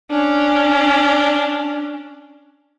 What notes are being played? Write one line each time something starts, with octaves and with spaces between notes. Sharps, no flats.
C#4 D4